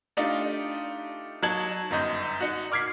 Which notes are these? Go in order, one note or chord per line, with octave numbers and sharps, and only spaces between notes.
A3 D4 D#4 F4 G4
F#3 D#4 A5 G#6 F#7
G1 F#2 D#5 G6
D#4 F#4
D6 F6 G#6 B6 C7